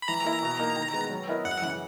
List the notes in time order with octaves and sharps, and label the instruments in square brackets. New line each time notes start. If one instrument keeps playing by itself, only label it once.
[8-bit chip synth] B5
[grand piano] E3 [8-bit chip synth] A#5
[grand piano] A#3 E4
B2
A#3 D#4
D#3
G#3 B3
F#3
B3 E4 A#4 D#5
[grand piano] F#2 [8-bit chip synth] F#5
[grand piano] C#3 E3